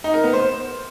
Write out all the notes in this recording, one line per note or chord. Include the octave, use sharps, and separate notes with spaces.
D#4
A#4
B3
C5